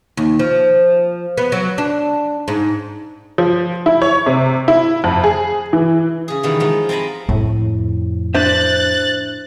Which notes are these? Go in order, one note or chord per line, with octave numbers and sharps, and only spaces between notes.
D#2
F3
B3
F#3
D4
G#2
F3
E4
C#5
C3
E4
F2
G#4
E3
C#3 G#4
B2 D#3 E3 G3 B3
F3 G#3 B3 D#4
C4 A4 G#5 A#5 B5
F2 A2
D4 C5 E5 F#6 A6